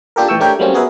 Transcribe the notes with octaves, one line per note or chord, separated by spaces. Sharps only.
A#3 D4 F4 G4 A4 A#4
A2 E3 G5 C#6 E6
A3 D4 G4 A#4 C#5 G5
F#3 G3 A3 A#3 C4 C#4
B3 F#4 G#4 A#4 B4 E5